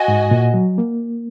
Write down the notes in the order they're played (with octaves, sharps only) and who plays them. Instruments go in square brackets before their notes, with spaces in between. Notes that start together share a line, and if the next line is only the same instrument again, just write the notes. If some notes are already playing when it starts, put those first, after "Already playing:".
Already playing: [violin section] F#4 D#5 G#5
[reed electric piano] G#2
A#2
F#3
A#3